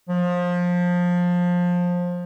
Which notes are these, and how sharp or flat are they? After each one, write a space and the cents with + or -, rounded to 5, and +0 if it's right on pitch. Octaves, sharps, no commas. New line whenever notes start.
F3 +20